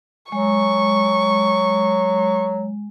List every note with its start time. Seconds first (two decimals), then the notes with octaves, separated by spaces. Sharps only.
0.32 F#3 G#3 C#6